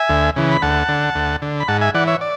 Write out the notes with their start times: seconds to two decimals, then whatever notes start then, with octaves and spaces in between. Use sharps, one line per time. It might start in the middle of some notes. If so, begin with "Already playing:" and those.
Already playing: E5 G#5
0.09 D2
0.36 C#3 E3
0.51 B5
0.62 D2 F#5 A5
0.89 D3
1.15 D2
1.42 D3
1.60 B5
1.68 G#2 F#5 A5
1.81 E5 G#5
1.94 E3 D5 F#5
2.07 C#5 E5
2.21 D5